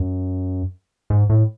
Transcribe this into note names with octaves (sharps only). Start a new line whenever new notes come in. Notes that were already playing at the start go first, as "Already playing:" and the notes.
Already playing: F#2
G#2
A2